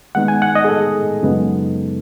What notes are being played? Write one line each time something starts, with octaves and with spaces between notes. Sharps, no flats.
D#3 G#3 B3 D#4 F#5
G#5
F#5
D#5
G#4
A4
F#2 C#3 G#3 B3 D#4